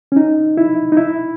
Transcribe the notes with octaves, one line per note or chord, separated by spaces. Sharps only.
C#4
D#4
E4
D#4
E4